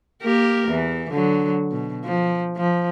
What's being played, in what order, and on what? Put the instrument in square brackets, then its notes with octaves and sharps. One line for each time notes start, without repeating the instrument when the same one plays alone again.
[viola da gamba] A#3 G4 A#4
E2 E3
D3 F#3
B2
F3
F3